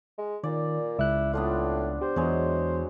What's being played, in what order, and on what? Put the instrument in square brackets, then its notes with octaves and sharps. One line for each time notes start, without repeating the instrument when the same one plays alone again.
[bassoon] G#3
[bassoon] A#2 [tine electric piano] D#3 [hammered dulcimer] D5
[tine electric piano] C#2 F#6 [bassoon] E4
[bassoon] A2 [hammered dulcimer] B3 D4 F4
[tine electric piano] G4 [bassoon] C5
[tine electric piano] E2 [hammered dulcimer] F#3 G#3